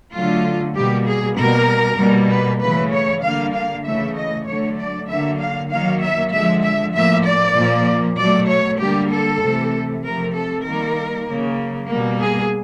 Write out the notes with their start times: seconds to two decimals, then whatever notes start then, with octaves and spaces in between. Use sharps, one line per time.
0.13 D3 F#3 A3 F4
0.75 B2 G3 A#3 G4
1.06 G#4
1.37 B2 G3 A#3 A#4
1.99 B2 G3 A#3
2.30 B4
2.61 C#3 E3 A3 B4
2.92 C#5
3.23 D3 G3 A#3 F5
3.54 F5
3.85 C#3 E3 A3 E5
4.15 D#5
4.46 D3 F#3 A3 C#5
4.78 D5
5.08 D3 F#3 A#3 E5
5.39 F5
5.70 D#3 F#3 A#3 F5
6.01 E5
6.32 D3 F3 G#3 E5
6.63 E5
6.94 A2 F3 A#3 E5
7.25 D5
7.56 A#2 F3 A#3
8.18 B2 F#3 A3 D5
8.48 C#5
8.80 D3 G3 A#3 G4
9.11 A4
9.41 C3 E3 A3
10.03 C3 F3 A3 A#4
10.35 A4
10.65 D#3 G3 A#3 A#4
11.28 C#3 F#3 A#3
11.89 B2 G3 A#3
12.20 G#4